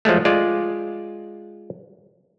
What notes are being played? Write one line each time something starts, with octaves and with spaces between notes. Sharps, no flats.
F3 F#3 G#3 A3
G#3 F4 D5